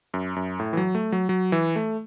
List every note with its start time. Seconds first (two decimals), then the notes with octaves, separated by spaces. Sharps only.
0.14 F#2
0.36 F#2
0.59 A2
0.73 E3
0.77 F#3
0.95 A3
1.12 F#3
1.29 F#3
1.52 E3
1.76 A3